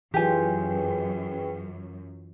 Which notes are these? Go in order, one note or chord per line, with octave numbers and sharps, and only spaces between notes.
F#2 E3 F4 G4 G#4 B4 G5 G#5